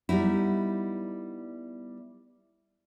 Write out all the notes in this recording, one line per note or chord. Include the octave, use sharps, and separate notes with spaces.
G3 B3 D#4 E4